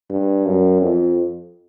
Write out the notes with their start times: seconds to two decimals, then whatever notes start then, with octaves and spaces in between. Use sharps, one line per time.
0.10 G2
0.46 F#2
0.82 F2